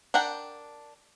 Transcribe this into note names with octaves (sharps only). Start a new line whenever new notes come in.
D4 A#4 F#5 G5